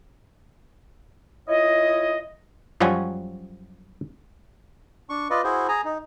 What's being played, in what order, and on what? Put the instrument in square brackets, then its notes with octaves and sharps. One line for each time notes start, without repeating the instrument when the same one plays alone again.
[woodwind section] E4 F4 C#5 D#5
[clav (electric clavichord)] F#2 F3 G3 F#4 C#5 G#5
[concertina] D4 C#6
F4 B4 D5 D#5
E4 F#4 G#4 C5
G#4 G#5 A#5
D#4